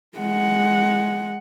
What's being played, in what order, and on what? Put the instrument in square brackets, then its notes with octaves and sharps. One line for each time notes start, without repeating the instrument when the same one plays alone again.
[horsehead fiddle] G#3 F#5